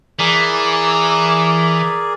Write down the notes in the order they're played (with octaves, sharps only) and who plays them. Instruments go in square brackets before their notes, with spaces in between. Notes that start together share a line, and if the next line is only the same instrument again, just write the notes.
[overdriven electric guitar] E3 [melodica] G#4 A#4 D5